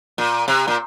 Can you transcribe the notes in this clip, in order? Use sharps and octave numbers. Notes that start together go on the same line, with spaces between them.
A#2
C3
A#2